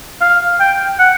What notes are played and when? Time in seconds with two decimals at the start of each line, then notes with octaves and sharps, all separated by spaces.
0.21 F5
0.60 G5
0.99 F#5